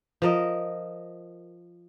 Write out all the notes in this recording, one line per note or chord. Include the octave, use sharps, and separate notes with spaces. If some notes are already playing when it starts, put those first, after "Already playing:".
F3 A#4 D#5